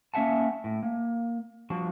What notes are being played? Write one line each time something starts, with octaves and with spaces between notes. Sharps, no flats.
A#3 C#4 E5 F#5 A5
A2
A#3
F3 G3 D4 F#4